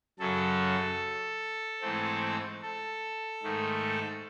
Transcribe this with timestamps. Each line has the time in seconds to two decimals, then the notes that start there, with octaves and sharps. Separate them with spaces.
0.19 F#2 C#3 F#3 A4
1.81 G#2 E3 A3 C4
2.62 A4
3.43 G#2 D#3 A3